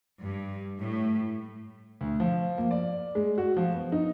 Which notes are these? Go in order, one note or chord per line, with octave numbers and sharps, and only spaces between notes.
G2
A2
D2
F3
A#3
D5
G#3
F#4
F3
B3
D#4